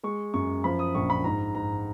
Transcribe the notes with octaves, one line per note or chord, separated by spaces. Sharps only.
G#3 C#6
F#2 C#6
F3 B5
D#6
A#1 C#6
B5
G#2 A#5
G#2 A#5